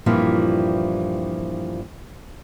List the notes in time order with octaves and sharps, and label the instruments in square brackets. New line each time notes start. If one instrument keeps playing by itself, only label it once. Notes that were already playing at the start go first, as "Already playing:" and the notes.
[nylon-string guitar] G2 A#2 E3 F3 C4 E4